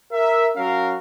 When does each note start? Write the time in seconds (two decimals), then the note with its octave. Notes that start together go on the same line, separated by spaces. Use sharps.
0.13 A#4 E5
0.56 F#3 C#4 F#4 A#4 F5